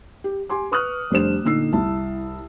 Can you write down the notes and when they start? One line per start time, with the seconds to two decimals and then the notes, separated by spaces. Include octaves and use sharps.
0.24 G4
0.49 G4 G#5 C6 D6
0.71 B4 C#6 D#6 F6 F#6
1.11 F1 G3 D4 C5 E7
1.44 A#2 D3 D#4 E6 C7
1.73 C2 E4 A5